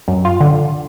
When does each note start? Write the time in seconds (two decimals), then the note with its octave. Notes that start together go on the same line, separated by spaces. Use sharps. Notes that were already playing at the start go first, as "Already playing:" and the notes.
0.08 F#2
0.25 F4
0.40 D3